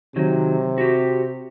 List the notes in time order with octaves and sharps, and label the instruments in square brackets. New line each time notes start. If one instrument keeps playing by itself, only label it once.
[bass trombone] C3 [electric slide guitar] D#3 F#3
[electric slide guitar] F#4 G4